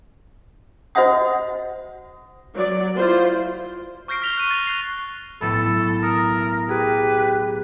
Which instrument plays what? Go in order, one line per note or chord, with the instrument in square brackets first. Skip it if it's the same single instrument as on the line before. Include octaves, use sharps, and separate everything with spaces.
[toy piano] F#4 C5 D#5 E5 F#5 D#6
[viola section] F#3 D5
E4 F4 C5
[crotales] C#6 F6 G6 A#6 C7 D7
F6 B6 F7 G7
F#6 D#7
A6 F7
F#6 C7 F7
[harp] B1 A2 A3 [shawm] A4 [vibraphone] B5
[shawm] A#4 [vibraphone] A#5 D#6
[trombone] G4 [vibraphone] G#4 [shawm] B4